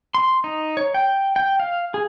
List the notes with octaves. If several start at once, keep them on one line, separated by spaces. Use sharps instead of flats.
C6
D#4
C#5
G5
G5
F5
G#4